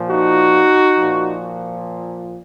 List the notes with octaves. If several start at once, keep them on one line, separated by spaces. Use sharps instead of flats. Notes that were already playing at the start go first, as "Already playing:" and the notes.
Already playing: A#2 F3
D#4 F#4
A#2 F3